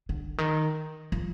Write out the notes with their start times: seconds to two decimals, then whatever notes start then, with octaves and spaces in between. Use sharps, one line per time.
0.09 D3
0.38 D#3
1.12 F3